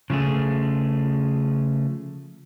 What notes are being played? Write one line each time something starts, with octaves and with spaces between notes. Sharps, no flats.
C#3 F3 A3 G#4